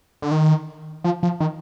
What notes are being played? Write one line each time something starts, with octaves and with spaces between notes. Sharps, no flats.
D3
D#3
F3
F3
D#3